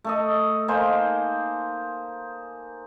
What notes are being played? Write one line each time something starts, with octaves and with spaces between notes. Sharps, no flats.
A3 A4 D#5
A#3 D#4 C5 G#5